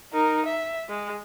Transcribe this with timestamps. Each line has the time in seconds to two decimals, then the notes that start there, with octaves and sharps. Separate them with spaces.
0.13 D#4 A#4
0.45 E5
0.89 G#3